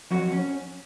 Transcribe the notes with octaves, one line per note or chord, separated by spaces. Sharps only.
F2 F#3 F#4
C#4